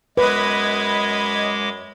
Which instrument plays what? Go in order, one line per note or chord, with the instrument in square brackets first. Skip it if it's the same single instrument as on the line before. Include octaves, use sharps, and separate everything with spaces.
[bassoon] F#2 [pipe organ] G#3 D6 [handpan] B4 [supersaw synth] D#5 B5 G#6